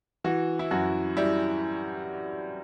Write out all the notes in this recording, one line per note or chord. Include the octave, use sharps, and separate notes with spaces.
E3 F#4
E4
F#2 F#4
G3 E4